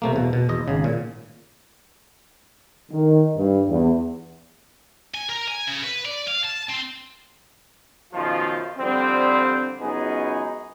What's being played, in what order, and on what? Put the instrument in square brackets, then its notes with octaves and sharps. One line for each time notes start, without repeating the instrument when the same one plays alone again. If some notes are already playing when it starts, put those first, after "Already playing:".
[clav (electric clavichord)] C3 A3 A#3
E2 B2
B2
E2 D#5
G#1 C#3
A#2
[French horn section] D#3
G2
E2
[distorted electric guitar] G#5
A#4
G#5
C#3
B4
D5
F5
A5
C4
[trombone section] B1 F#2 D#3 F3 F4
D3 F3 G3 C4
C#2 F#2 B3 C#4 D#4 G#4